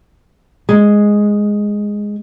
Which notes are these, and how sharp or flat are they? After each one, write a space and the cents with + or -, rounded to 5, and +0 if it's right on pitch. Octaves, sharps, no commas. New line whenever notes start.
G#3 -5